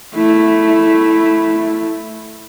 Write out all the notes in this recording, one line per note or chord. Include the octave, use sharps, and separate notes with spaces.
A3 E4